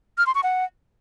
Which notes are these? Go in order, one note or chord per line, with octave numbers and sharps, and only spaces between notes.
F6
C6
C#6
F#5